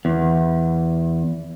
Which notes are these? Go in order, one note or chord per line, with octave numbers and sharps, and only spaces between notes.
E2